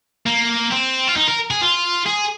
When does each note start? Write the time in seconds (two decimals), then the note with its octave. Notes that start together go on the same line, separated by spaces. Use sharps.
0.26 A#3
0.71 C4
1.07 F4
1.16 D#4
1.28 A#4
1.51 G#4
1.61 F4
2.06 G#4